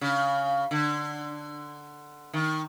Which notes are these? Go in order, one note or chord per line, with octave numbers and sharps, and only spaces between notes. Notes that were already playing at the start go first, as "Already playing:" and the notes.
C#3
D3
D#3